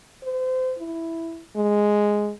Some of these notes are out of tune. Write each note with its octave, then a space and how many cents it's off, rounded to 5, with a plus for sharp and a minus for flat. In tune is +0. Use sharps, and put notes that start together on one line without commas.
C5 -30
E4 +0
G#3 +0